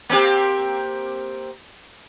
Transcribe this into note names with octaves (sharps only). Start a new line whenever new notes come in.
A#3 C4 G4